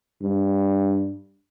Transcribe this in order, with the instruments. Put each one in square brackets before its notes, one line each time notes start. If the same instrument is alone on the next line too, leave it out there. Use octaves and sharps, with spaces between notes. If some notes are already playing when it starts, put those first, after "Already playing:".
[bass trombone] G2